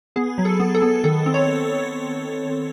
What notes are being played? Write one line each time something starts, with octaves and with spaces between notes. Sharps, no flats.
B3 G#4
F#3
A4
B3
A4
B3
D#3 A4
C4
C#5